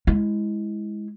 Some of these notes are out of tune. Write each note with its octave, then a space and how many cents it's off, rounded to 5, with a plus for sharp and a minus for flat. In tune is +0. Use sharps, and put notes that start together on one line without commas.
G#3 +0 E4 -10